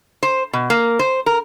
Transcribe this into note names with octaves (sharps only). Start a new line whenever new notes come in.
C5
B2
A#3
C5
A#4